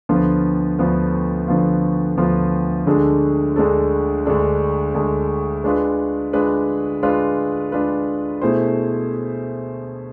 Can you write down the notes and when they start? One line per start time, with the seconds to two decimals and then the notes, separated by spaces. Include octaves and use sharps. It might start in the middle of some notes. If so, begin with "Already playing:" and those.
0.09 D2 D3 F3 B3 F4
0.79 D2 D3 F3 B3 F4
1.48 D2 D3 F3 B3 F4
2.17 D2 D3 F3 B3 F4
2.86 D2 D3 G#3 D4 A4
3.56 D2 D3 G#3 D4 A4
4.25 D2 D3 G#3 D4 A4
4.95 D2 D3 G#3 D4 A4
5.64 G#3 D4 F4 B4
6.33 G#3 D4 F4 B4
7.03 G#3 D4 F4 B4
7.72 G#3 D4 F4 B4
8.42 B2 A3 E4 G#4 C5